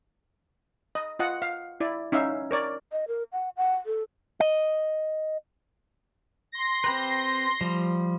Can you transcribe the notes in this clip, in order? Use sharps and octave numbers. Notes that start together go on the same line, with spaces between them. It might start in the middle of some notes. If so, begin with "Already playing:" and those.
D#5
F4 D#5 F#5
F5
E4 D5
C#4 D#4 E5 F5
A#4 C#5 D5
D#5
A#4
F#5
F#5
A4
D#5
C6 A#6
C4 G4 B4
F3 G3